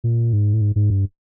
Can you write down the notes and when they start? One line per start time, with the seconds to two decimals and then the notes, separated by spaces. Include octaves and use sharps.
0.04 A#2
0.33 G#2
0.54 A2
0.61 G#2
0.76 G#2
0.90 G2